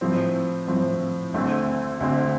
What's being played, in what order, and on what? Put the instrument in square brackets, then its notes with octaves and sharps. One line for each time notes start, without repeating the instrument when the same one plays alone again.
[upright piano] A2 F3 C4
A2 F3 C4
D2 D3 A3 C4
D2 D3 A3 C4